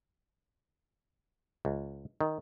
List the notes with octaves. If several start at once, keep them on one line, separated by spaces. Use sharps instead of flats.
C#2
D#3